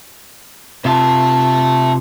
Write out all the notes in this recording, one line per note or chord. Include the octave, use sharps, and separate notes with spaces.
C3 F4 E5 A5